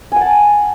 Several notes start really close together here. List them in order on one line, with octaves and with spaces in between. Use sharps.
G#5 F#5 A5